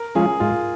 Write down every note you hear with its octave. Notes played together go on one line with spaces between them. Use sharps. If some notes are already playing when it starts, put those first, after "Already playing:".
Already playing: A#4
F3 G#3 C#4 F4 G#4
G#2 F4